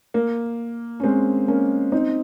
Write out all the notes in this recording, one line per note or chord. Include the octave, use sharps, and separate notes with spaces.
A#3
C#4
G#3 C4
A#3 C#4
C4 D#4